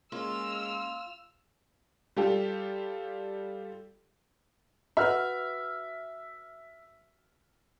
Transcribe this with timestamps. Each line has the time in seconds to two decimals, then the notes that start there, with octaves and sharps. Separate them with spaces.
0.12 G#3 A#3 C#4 F4 E6 F6
2.16 G3 F4 G4 A4
4.97 F#4 B4 E5 F6